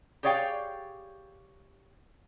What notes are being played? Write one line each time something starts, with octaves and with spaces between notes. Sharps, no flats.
G4 G#4 C#5 D5 F5 G5